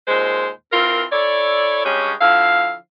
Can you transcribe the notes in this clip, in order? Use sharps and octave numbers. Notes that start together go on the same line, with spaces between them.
D#2 A#2 G#3 C5
E3 C4 F4 A#4
E4 A4 C#5 D5
G2 G#3 C#4 G4 C#5
D3 F3 E4 F5